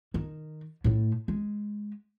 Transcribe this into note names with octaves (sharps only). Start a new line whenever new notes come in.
D#3
A2 A3
G#3